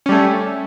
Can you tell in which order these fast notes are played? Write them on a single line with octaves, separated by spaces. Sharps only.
C#4 G3 A3